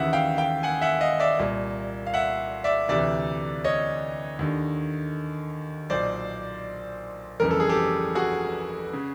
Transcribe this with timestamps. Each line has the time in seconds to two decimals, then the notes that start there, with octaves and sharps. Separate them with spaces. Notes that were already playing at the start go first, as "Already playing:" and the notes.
Already playing: D#2 C#3 E3 E5 F#5
0.13 F5 G5
0.38 F5 G5
0.63 F#5 G#5
0.82 E5 F#5
1.01 D#5 F5
1.20 D5 E5
1.39 C2 A#2
2.07 F5
2.14 E5 F#5
2.64 D5 E5
2.89 D2 C3 E3 D5 E5
3.64 C#5 D#5
4.39 D#2 D3
5.90 B1 A#2 C5 D5
7.40 G1 F2 C#3 E3 A#4
7.51 A4
7.60 G#4
7.69 G4 A4
8.15 F#4 G#4
8.93 C#3